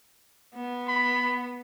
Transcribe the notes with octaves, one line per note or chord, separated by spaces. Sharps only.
B3
B5